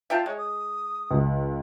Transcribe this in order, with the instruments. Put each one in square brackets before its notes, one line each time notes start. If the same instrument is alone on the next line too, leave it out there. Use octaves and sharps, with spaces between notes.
[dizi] F4 [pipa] E5 G5 A5
[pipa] G#3 [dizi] C#5
[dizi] D#6
[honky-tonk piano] C#2